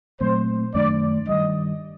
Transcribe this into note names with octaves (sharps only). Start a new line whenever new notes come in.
A#2 F#3 A3 C4 C5
F#2 D#3 A3 D4 D5
G2 D#3 G3 D#5